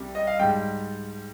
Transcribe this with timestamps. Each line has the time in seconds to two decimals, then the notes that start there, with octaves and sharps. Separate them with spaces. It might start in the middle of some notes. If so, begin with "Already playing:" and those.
Already playing: C2 C3 G3
0.15 D#5
0.27 F5
0.39 G#2 G3 G5